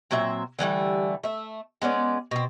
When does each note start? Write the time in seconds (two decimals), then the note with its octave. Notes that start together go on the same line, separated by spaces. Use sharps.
0.11 A#2 F#3 C4 E5
0.59 D3 E3 G3 A3
1.23 A3 E5
1.82 G#3 B3 C#4 D5
2.31 B2 C4